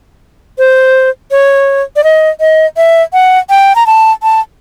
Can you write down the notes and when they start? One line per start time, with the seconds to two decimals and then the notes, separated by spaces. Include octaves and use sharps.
0.58 C5
1.31 C#5
1.96 D5
2.04 D#5
2.40 D#5
2.77 E5
3.13 F#5
3.50 G5
3.76 A#5
3.87 A5
4.23 A5